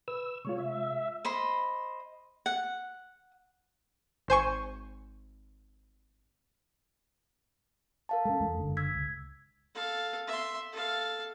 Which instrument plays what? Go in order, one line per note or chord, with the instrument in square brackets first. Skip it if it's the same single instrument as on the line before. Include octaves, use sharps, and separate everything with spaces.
[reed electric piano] B4 [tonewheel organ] E6
[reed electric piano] C3 G#3 F4 [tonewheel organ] C#5
[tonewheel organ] E5
[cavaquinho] C5 D#5 B5
F#5
[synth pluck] G#1 C5 G#5 C#6
[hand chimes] A#4 F5 A5
[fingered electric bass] G#3 C#4 [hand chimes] A4
[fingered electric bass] E2 G#3
F#1 D3
[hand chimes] E6 G#6 B6
[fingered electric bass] C#2
[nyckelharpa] A4 F5
E5 C6
A4 F5